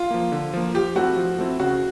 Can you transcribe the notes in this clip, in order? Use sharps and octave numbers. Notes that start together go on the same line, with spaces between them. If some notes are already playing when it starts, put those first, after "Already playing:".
Already playing: F4
F3 A#3
D3
F3 A#3
F3 G4
A3 C4 E4 F#4
F3
A3 C4 E4
C#3 F#4